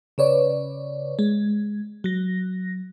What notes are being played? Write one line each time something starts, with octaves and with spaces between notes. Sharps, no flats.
C#3 B4 C#5 D5
G#3
F#3 A#6